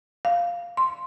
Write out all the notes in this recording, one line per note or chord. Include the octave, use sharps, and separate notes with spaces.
F5
C6